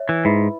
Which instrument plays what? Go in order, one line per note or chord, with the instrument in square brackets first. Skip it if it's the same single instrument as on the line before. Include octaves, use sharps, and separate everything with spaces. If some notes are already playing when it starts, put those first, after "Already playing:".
Already playing: [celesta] C#5 E5
[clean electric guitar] E3
[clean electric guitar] G#2 [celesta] E4 B4 E5 B5